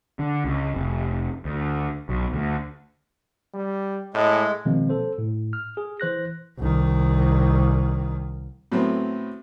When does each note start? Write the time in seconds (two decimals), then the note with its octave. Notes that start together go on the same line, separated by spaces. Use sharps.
0.19 D3
0.45 C#2
0.75 F1
1.45 D2
2.09 B1
2.33 D2
3.54 G3
4.14 A2 G#3
4.65 B2 D#3 F3 G#3 A#3 C4
4.89 A4 C5
5.18 A2
5.53 F6
5.77 G#4
6.00 E3 C5 F#6 A#6
6.58 C2 D#3
8.72 A2 F#3 B3 C4